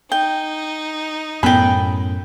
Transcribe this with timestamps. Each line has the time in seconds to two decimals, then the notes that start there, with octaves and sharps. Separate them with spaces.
0.12 D#4 G5
1.43 F#2 A2 B3 G5 B5